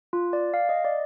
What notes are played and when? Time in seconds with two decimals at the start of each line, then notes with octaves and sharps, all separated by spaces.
0.13 F4
0.33 D5
0.54 F5
0.69 D#5
0.85 D5